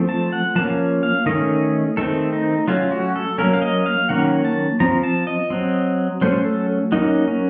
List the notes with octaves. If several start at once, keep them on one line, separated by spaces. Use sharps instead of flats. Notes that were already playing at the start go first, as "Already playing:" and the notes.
Already playing: F3 A3 C4
A5
F#5
F3 A#3 C#4 A5
F5
D#3 A3 C#4 D#5
D#3 A3 C4 A4
D#4
F#3 A3 C#4 F4
F#4
A4
F#3 A#3 C#4 A#4
F5
D#5
F5
D#3 F#3 A#3 C#4 F#5
A5
F3 C4 A#5
A5
D#5
F#3 C4
F#3 A3 C#4 C5
A4
F#3 A#3 C#4 D#4
C#4